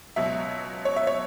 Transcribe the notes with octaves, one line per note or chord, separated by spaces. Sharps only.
C#2 B2 F#3 E5
C#5
E5
C#5